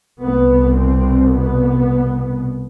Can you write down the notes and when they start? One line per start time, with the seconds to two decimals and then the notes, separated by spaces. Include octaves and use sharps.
0.20 C2 B2 B3
0.75 C4
1.31 B3